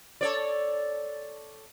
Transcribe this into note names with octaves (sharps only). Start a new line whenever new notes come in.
A4 C#5 D5